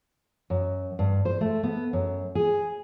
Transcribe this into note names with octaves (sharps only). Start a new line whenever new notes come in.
F#2
G2
C5
A3
B3
F#2
G#4